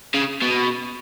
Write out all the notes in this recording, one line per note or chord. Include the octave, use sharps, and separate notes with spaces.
C#3
B2